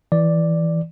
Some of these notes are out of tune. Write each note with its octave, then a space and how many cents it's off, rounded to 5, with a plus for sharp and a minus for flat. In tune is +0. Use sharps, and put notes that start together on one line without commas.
E3 -5 D5 +0